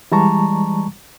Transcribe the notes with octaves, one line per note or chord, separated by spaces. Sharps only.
E3 G3 G#3 A5 A#5 C#6